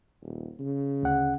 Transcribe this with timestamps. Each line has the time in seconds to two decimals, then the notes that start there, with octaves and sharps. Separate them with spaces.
0.22 D#1
0.59 C#3
1.03 D2 F#5